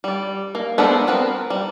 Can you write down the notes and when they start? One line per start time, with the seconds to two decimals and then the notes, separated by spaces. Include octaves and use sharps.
0.04 G3 D5
0.55 A#3
0.78 B3 D4 A4 A#4 C5
1.07 B3 C4 A#4 B4
1.50 G3